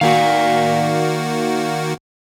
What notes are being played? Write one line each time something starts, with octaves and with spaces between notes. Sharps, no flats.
D#3 A#3 F#4 D5 F5